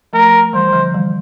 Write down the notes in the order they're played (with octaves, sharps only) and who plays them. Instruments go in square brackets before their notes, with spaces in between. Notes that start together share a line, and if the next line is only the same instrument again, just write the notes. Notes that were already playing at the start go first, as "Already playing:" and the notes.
[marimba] F3 A3 [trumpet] A#4
[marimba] E3 G3 [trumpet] C5
[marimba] D3 F3
E3 G3